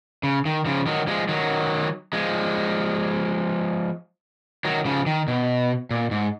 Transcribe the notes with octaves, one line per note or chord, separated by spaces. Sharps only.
C#3
D#3
C#3 F3
D#3 F#3
F3 G#3
D#3 F#3
F3 G#3
D#3 F#3
C#3 F3
D#3
B2
A#2
G#2